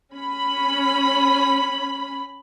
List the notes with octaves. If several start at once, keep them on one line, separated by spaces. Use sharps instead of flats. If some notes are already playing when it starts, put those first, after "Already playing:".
C#4 B5